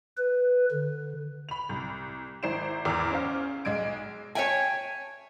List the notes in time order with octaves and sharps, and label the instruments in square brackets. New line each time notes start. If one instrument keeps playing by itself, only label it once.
[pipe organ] B4
D3
[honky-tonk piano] B5 F7
C2
G#1 E4 C5 C7 D7 E7
E2 A#4 D6 E6 F6
C#4 C5 F5
B1 G#3 G#6 D7
[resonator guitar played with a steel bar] C#5 D5 E5 G5 G#5